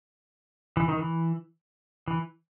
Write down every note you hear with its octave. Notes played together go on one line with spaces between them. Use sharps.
E3
D#3
E3
E3